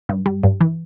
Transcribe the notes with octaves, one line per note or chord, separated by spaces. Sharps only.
G2
G3
G2
E3